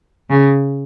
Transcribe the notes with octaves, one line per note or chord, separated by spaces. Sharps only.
C#3